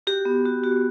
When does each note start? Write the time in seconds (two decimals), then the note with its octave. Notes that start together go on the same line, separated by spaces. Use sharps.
0.07 F#4 G4
0.25 B3
0.46 F#4
0.64 F#4